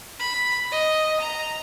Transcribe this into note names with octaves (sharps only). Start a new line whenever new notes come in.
B5
D#5
A#5